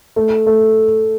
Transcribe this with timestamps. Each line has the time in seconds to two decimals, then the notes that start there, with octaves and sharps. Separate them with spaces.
0.16 A3
0.46 A3